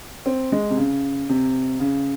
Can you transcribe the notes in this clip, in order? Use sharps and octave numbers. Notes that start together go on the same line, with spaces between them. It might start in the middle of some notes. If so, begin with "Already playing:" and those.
C4
G#3
C3
C#3
C3
C#3